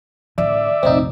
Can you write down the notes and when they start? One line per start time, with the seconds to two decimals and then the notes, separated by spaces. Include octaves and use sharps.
0.38 A1 D3 D5 E5
0.83 F1 A#1 C4 D#4